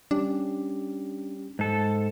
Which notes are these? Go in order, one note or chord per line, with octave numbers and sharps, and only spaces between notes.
G3 C#4 D4 G4
G#2 A4